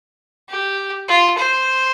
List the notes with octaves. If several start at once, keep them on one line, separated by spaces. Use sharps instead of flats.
G4
F4
C5